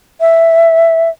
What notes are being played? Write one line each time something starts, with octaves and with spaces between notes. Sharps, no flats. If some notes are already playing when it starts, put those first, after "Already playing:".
E5